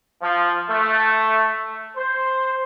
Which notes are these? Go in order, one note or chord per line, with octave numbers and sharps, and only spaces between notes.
F3
A3
C5